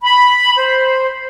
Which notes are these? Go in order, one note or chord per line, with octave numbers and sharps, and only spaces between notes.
B5
C5